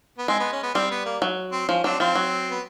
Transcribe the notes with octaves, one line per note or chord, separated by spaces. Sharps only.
B3
G#3 C4
B3
C#4
B3
G3 C4
B3
A#3
F#3
C4
F3 C#4
F#3 C4 D4
F3 C4
F#3
B3